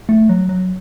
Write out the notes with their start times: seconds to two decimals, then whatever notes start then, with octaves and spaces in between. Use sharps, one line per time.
0.09 A3
0.29 F#3
0.49 F#3